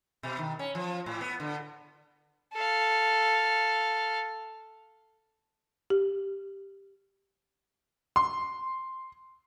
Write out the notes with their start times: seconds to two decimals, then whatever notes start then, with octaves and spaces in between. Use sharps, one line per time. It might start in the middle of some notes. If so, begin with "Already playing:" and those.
0.23 B2
0.39 D#3
0.59 C#4
0.75 F3
1.06 A2
1.21 B3
1.40 D3
2.54 A4 F5
5.90 G4
8.16 C6